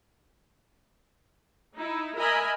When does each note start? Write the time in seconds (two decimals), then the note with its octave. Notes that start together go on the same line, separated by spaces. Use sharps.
1.75 D#4 E4
2.16 A#4 D#5 E5 G#5 B5